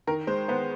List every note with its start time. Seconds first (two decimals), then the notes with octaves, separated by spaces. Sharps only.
0.07 D#3 A#4
0.27 G#3 C5
0.48 B3 C5